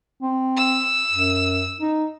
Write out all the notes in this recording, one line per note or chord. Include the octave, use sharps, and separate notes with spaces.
C4
E6
F#2
D#4